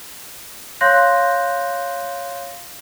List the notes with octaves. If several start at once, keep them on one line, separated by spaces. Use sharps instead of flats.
C#5 F5 C6 F#6 G6 A#6